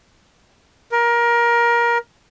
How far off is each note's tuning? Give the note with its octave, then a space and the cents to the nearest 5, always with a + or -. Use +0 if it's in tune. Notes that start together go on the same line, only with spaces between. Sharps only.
A#4 +20